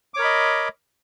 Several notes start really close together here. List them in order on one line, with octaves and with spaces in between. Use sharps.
D6 C#5 A#4 B5 D#5